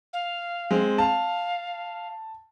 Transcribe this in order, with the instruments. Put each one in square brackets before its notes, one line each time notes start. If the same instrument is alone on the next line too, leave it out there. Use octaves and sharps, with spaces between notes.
[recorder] F5
[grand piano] G#3 C4
[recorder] F5 [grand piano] A5